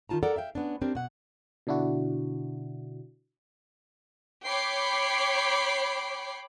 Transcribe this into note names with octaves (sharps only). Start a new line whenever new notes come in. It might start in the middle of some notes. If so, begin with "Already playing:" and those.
D#3 D#4 F4 A5 A#5
A4 A#4 D5 F#5 A#5
E5 F5 G5
B3 C#4 D4
C4 D4 G4 A#4
B2 F#5
B2 D3 D4 E4 F#4
C#5 G5 B5 D6 C7